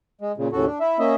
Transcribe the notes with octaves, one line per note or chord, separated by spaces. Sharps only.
G#3
A#2 C#3
D#2 A2 C#3 F#4 A4
D4
E4 E5
A#3 C#4 D#5 E5